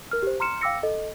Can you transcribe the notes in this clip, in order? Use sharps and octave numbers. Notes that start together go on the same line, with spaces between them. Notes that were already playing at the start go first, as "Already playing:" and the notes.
A#4 F6
G4 C5
A#5 C6 F6 C#7 E7
F5 G5 D6 E6 A#6 C#7
A4 D#5